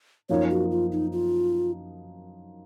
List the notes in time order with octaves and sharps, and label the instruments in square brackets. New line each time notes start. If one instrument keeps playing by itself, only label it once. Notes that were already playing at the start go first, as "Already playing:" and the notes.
[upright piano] F#2 F3 A#3 D#4 [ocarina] C#5
[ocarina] F#4
F4
D#4
F4